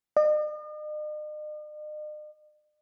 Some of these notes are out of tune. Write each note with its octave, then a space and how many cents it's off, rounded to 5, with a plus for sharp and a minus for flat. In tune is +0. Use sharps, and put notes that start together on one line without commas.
D#5 -45